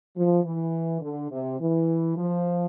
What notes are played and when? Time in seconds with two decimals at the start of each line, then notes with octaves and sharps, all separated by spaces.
0.16 F3
0.45 E3
1.02 D3
1.31 C3
1.60 E3
2.17 F3